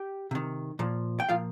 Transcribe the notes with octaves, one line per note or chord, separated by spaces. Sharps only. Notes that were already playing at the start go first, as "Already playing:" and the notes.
Already playing: G4 G5
C3 D#3
A#2 F3
G5
A#2 F3 F4 F5